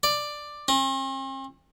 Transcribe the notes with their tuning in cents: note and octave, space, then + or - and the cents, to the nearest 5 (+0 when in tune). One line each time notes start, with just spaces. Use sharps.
D5 +10
C4 +45